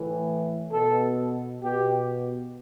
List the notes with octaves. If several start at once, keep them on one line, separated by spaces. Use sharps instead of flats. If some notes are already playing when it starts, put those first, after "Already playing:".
Already playing: A2 E3
B2 A4
B2 G4